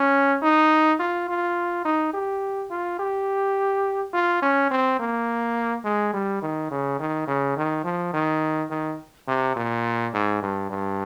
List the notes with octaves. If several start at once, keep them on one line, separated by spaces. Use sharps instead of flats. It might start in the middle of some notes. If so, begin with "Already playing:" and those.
Already playing: C#4
D#4
F4
F4
D#4
G4
F4
G4
F4
C#4
C4
A#3
G#3
G3
D#3
C#3
D#3
C#3
D#3
F3
D#3
D#3
C3
A#2
G#2
G2
G2